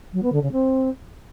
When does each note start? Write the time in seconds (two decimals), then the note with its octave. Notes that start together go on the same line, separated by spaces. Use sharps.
0.13 F#3
0.22 B3
0.32 D3
0.42 C#3
0.52 C4